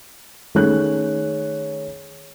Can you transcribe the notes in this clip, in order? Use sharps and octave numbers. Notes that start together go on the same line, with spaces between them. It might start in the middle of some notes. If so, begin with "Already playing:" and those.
D#3 A3 C#4 G#4 C#5 F#6